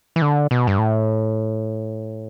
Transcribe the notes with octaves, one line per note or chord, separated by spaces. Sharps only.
E3
D3
B2
G2
A2